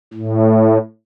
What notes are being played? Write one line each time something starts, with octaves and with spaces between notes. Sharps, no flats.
A2